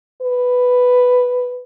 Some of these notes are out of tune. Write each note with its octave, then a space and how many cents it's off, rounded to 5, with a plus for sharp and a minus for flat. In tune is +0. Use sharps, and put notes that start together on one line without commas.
B4 +5